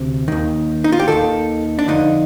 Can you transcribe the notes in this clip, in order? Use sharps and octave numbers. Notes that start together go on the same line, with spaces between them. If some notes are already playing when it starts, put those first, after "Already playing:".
Already playing: D2 C3
D#2 D#3
D#4
F4
G4
D#2 D#3 A4
D4
F2 D3 D#4